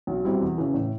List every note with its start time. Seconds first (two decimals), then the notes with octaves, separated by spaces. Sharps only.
0.07 B1
0.24 B2 G3 C4 E4
0.40 E2
0.58 C#3 E3
0.74 A2